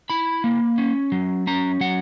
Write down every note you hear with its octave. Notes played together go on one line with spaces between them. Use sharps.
E4 B5
A#3
C#4
F#3
C#4 A#5
F#3 F#5